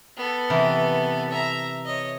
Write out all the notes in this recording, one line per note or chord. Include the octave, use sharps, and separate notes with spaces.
B3 A4
C3 E3 A#4
E5 A#5
C#5 D#5